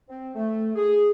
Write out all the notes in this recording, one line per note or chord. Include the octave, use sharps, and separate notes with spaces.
C4
A3
G#4